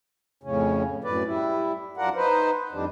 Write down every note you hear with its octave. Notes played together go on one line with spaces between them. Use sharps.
F2 A2 C#3 C#4
F#2 A2 B4 D5
G3 E4
F#2 D4 F4 A#4 F#5
D#4 B4 C5
F2 D#3 G3 D4